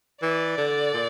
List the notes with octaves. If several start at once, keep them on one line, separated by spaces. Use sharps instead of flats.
E3 D5
D3
A#2